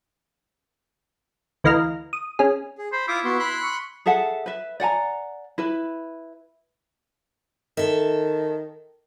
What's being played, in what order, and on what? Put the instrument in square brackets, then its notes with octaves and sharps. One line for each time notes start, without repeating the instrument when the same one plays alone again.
[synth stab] D2 E3 D#5 F5 A#5 F6
D#6
C#4 G#4
[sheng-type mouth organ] G#4
[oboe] C5 [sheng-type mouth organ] B5
[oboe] E4 [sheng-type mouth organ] F4 D6 D#6
[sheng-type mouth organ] B3 F#4 C6
B5 C6 F#6
[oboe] C#6
[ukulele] G#4 A4 E5 F#5
B4 E5
D5 F#5 G#5 A#5
E4 B4
[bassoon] D#3 [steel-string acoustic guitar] A4 E5